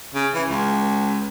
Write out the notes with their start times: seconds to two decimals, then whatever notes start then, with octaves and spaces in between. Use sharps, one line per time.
0.14 C#3
0.35 E3
0.49 C#2